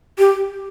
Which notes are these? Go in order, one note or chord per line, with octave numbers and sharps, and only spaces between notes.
G4